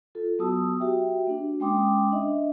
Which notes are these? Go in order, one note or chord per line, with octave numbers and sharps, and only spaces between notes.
F4 A4
F#3 B3 F#4 A5 D#6 E6
F#4 G4 E5 G5
A#3 D4
G#3 C#4 G5 C6 D6 D#6
D4 D#5 E5